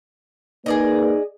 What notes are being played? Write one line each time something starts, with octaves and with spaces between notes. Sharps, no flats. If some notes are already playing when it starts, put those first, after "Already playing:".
A#3 D#4 G#4 B4 D5 D#5